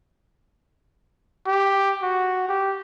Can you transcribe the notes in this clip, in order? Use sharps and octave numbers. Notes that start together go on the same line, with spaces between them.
G4
F#4
G4